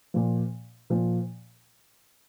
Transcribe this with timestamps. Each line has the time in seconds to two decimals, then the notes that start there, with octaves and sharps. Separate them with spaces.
0.14 A#2 F3
0.90 A#2 F3